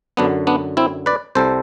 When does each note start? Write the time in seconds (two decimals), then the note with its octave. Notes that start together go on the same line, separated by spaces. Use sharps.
0.17 F#2 D3 F#3 B3 D4
0.47 B3 D4
0.77 C4 E4
1.06 B4 D5
1.35 C2 C3 G3 A4 C5